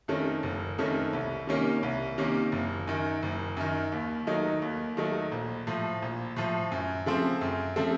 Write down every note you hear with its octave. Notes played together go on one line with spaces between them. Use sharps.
F2 D#3 A3 C#4
F#1
F2 D#3 A3 C#4
C2
C3 D#3 A#3 C#4
C2
C3 D#3 A#3 C#4
F#1
F#2 D#3
F#1
F#2 D#3
D#2
D#3 F#3 A3 D#4
D#2
D#3 F#3 A3 D#4
A#1
A2 F3
A#1
A2 F3
F#2
C#3 F3 A3 C4
F#2
C#3 F3 A3 C4